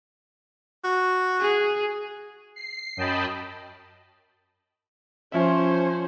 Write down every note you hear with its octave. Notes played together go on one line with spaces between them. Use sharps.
F#4
G#4
C7
F#2 D#5 G5 A5 B5
F3 C#4 C5 E5